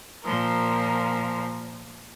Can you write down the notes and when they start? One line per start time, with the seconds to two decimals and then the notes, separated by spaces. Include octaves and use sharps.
0.24 A#2 F3 A#4